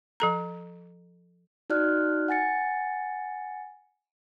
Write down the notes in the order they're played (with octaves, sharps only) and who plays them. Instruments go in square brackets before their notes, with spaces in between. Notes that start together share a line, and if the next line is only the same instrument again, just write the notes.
[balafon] F3 A4 A#5
[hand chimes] D#4 F#4 D5 F6 F#6
F#5 G#5 A6 C#7